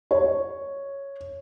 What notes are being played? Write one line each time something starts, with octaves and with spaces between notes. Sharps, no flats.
C#5